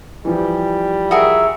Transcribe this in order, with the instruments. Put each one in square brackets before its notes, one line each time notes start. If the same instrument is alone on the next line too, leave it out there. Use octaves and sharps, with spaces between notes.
[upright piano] E3 F3 [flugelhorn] G3
[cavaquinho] F#4 G#4 A#4 [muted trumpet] E5